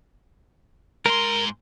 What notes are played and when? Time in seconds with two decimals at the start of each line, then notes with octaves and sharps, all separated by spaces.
1.06 G#2 A#4 C6